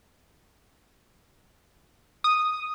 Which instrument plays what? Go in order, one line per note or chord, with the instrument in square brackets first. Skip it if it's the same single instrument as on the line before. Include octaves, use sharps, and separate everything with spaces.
[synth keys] D#6